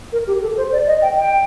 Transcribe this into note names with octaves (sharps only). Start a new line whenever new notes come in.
A#4
G4
A4
C5
D5
D#5
G5
G5